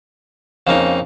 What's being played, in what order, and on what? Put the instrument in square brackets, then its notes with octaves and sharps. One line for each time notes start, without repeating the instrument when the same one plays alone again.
[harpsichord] F2 C#3 A#3 D#4